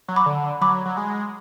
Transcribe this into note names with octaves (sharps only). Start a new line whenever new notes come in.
F#3
B5 D6
D3
F#3 B5 D6
F#3
G#3